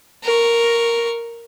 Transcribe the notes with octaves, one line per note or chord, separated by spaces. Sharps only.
A#4 C#6